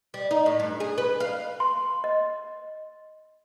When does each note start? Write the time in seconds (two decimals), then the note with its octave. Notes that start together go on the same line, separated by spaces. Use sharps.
0.14 G3
0.31 D#4
0.46 A2
0.60 G2
0.80 G#4
0.98 B4
1.20 F5
1.60 C6
2.04 D#5